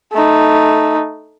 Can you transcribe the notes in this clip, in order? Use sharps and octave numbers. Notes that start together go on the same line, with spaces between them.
A3 D#4